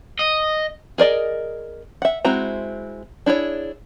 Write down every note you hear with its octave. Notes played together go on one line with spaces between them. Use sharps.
D#5
G#4 A#4 D5 D#5
E5 F#5
G#3 C4 E4 F#4 A#5
D4 E4 G#4 C#5